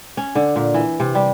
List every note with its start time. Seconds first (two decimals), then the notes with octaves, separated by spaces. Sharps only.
0.17 C#4
0.35 D3
0.56 A#2
0.74 E3
1.00 C3
1.15 G3